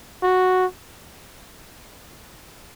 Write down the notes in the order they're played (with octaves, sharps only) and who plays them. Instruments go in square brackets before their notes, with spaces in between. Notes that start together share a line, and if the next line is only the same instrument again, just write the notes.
[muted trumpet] F#4